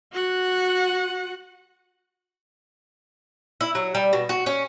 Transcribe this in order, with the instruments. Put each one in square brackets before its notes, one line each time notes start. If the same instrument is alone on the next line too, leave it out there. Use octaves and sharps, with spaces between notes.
[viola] F#4 F#5
[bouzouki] E4
F#3
G3
B2
F#4
C#4